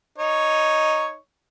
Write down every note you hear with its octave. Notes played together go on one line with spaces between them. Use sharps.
D#4 C#5